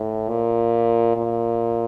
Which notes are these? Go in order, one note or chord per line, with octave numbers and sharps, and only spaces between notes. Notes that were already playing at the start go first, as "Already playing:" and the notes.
Already playing: A2
A#2
A#2